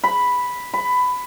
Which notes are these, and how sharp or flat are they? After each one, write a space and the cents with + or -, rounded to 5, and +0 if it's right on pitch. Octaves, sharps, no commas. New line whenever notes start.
B5 +0
B5 +15